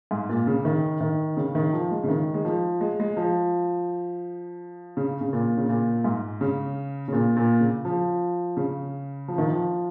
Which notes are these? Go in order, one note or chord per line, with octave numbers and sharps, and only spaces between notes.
G#2
A#2
C#3
D#3
D#3
C#3
D#3
F3
G#3
C#3
D#3
G#3
F3
G#3
G#3
F3
C#3
C#3
A#2
C#3
A#2
G#2
C#3
C#3
A#2
A#2
C#3
F3
C#3
F3
D#3
F3